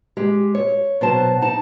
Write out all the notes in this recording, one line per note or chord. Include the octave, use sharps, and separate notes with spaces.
G#3 G4
C#5
B2 F#3 C5 A5
D#4 A5